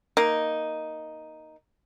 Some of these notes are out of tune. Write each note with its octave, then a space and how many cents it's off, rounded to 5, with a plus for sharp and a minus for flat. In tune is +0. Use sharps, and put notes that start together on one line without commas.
A#3 +0 D#4 +0